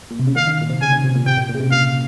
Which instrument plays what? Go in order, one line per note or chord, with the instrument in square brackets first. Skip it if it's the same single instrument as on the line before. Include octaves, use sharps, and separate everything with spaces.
[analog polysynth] A#2
C3
C#3
[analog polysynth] D#3 [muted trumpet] F5
[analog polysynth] D#3
A#2
C3
[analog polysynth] C#3 [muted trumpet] G#5
[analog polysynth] C#3
C3
A#2
[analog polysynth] C3 [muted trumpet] G5
[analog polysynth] A#2
A#2
C#3
C3
[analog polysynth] A#2 [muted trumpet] F5